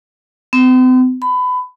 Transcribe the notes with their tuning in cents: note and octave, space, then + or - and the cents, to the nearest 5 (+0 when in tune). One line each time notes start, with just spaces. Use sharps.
C4 -45
B5 +25